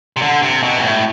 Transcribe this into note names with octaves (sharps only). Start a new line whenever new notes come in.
C3
D3
C3
B2
G#2
A2